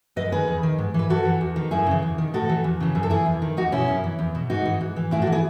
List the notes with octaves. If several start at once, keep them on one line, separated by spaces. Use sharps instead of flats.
F#2 B4 D#5
D#3 G#4 B4
E2
D#3
G#2
E3 B4
F#2 F#4 A4
E3
E2
D#3
F#2 E4 G#4
C#3 E3
E2
D#3
A2 F#4 A4
E3
E2
C#3 E3
F#2 G#4
A4
E3 E4 G#4
E2
D#3
E2 D#4 F#4
B2 C#4 E4
F#2
E3
E2
B2
G#2 D#4 F#4
E3
G#2
E3
A2 E4 G#4
F#4 A4
E3
E4 G#4